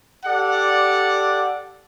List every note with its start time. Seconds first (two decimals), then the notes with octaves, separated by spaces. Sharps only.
0.24 G4 A4 D5 F#5